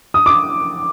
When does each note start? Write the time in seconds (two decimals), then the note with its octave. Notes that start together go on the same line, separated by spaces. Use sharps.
0.14 D#6
0.26 D6